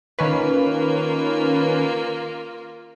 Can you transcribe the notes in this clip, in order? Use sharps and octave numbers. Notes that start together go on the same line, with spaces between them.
D#3 A#3 C#4 F4 B4